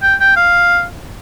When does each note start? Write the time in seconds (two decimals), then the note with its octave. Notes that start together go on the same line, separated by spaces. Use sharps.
0.03 G5
0.20 G5
0.36 F5